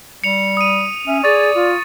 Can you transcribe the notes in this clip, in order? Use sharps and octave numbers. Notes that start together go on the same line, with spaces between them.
G3 C#7 F7
D#6 D#7
C#4 E5
G#4 D5 C#6 A6
F4